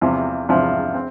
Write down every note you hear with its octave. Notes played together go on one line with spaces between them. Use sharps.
E2 C3 F3
E2 C3 F3
C4